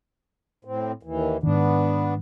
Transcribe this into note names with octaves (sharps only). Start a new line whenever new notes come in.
A2 C4
D#2 E3
G#2 D#3 B3 D4